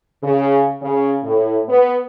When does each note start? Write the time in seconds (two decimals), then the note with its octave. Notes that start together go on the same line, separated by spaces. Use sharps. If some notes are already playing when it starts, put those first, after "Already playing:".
0.23 C#3
0.82 C#3
1.24 A2
1.68 B3